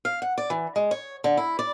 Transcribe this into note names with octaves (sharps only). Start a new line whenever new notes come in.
F5
F#5
D5
E3
G#3
C#5
D3
E4
D5